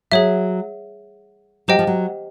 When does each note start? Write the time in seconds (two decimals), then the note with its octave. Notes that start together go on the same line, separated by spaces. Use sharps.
0.12 F#3 G#4 C#5 E5
1.68 F#3 G4 C5 D#5 G5
1.79 F3
1.87 F#3